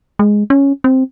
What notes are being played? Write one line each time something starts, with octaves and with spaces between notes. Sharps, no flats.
G#3
C#4
C4